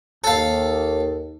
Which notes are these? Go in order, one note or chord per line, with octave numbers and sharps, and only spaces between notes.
D#2 A4 F5